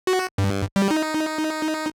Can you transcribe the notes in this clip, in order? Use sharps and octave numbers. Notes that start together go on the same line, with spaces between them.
F#4
G2
G3
D#4